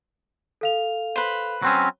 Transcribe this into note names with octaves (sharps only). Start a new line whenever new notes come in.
A4 F5 F7
B4 C5
F#3 C4 C#4